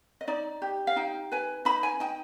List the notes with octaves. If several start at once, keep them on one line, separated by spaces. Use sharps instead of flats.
D#5
D#4 D5
G4
F5
D#4 G5
B4 G#5
D#4 B5
G#5
D#4 G5